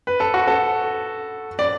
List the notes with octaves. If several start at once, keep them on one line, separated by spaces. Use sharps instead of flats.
B4
A4
F#4
A4
D5